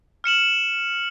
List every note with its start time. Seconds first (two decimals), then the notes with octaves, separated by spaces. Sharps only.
0.24 F6 C#7 E7 F#7